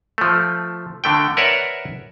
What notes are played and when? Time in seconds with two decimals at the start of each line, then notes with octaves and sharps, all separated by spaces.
0.18 F3 A3
1.04 D3 A3 G5
1.37 A#4 B4 C#5 D5 E5 F#5